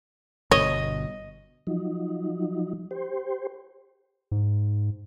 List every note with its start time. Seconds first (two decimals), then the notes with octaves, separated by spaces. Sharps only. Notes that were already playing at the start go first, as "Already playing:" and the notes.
0.51 G1 B2 C#5 D#5
1.67 F3 F#3 D#4
2.91 G4 C5
4.32 G#2